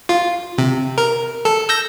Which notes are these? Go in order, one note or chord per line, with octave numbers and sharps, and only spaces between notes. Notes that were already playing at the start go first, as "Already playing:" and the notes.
F4
C3
A#4
A4
E6 G6 A#6